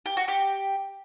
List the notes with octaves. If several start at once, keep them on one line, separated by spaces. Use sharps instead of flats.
G4
F#4
G4